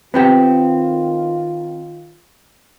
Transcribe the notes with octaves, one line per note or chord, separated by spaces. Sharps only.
D#3 B3 C4 F4 G4